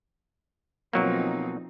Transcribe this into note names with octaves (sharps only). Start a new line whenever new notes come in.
B1 F3 F#3 A#3 C4 D#4